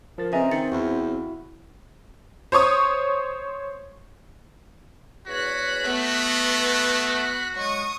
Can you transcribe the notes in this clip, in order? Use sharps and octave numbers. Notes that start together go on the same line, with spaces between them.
F3 A#4 A6
C#3 C4 B4 D#5 E5 G#5 A#5
D#3 A6 C#7
E2 E4 F#4
C5 C#5 C#6 D#6
E2 F#4 C#5 F#6 B6
A3 B3
F#3 G#3 C#6 D#6